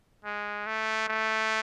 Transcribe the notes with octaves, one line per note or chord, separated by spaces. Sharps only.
G#3
A3
A3